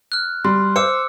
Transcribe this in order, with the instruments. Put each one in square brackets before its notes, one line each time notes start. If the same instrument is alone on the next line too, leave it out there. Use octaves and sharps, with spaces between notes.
[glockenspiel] F6 F#6
[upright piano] G3 [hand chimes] C6
[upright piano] C5 [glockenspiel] D6 E6 C#7